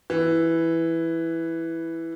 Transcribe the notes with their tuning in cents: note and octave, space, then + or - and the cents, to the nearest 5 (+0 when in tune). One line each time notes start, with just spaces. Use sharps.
E3 +0